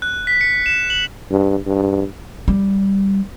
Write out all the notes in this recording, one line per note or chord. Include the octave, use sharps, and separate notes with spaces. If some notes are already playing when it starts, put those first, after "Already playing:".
F#6
B6
C#7
E7
F#7
G2
G2
G3